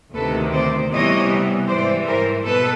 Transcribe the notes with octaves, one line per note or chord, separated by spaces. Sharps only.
D2 C3 D#3 A4 B4
C5 D5
C3 E3 G3 B3 C#5 D#5
G#2 E3 G3 C5 D5
A#4 C5
B2 A4 B4